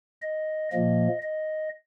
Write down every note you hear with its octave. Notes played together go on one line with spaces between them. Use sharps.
D#5
A#2 F3 A#3 D#5
D#5